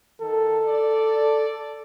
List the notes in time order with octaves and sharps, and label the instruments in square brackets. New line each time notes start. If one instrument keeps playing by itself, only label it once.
[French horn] D#3 [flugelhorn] A4
[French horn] D5